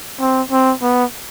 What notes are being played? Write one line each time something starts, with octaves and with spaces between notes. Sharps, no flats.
C4
C4
B3